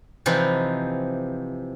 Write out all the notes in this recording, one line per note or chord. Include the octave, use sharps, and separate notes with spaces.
C3 E3 F3 D#4